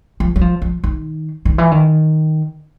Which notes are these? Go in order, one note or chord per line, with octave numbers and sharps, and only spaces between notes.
F3
F#3
F3
F3
D#3
D#3
E3
D#3